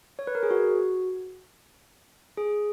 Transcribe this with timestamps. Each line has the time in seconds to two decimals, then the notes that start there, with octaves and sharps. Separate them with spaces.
0.19 C#5
0.27 B4
0.35 A#4
0.43 G#4
0.51 F#4
2.38 G#4